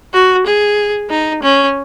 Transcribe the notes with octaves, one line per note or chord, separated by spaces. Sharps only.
F#4
G#4
D#4
C#4